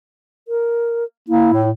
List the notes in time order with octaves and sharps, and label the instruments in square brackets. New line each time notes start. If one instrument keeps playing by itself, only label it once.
[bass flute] A#4
[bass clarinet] A#3 [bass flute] E4
[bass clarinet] A2